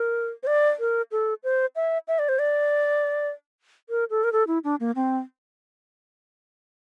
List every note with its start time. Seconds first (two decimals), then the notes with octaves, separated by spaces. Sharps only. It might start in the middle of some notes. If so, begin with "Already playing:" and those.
Already playing: A#4
0.43 C5
0.47 D5
0.80 A#4
1.12 A4
1.44 C5
1.76 E5
2.08 E5
2.19 D5
2.29 C5
2.39 D5
3.89 A#4
4.10 A4
4.24 A#4
4.33 A4
4.47 E4
4.64 D4
4.80 A#3
4.96 C4